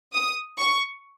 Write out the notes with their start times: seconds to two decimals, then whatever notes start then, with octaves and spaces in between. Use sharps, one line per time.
0.13 D#6
0.58 C#6